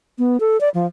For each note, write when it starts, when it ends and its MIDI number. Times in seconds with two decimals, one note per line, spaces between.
0.19 0.40 59
0.40 0.59 69
0.61 0.69 74
0.74 0.87 53